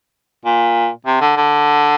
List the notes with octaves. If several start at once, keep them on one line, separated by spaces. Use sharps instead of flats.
A#2
C3
D3
D3